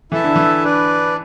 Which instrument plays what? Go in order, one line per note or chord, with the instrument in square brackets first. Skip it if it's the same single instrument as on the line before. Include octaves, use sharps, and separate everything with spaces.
[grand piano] E3 [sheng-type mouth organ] E4 A4 E5 A5
[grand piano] D3
E3
[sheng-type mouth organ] D4 B4 D5